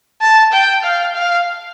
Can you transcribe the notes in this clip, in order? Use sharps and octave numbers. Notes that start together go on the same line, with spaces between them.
A5
G5
F5
F5